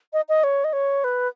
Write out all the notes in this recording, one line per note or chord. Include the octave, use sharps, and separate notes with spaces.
D#5
D#5
C#5
D#5
C#5
B4